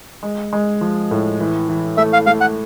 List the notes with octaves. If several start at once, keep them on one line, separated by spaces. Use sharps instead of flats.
G#3
G#3
F3
A2
E3
E3
A3 E5
F5
A3 F5
F#5